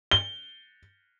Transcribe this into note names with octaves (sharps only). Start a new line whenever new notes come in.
G7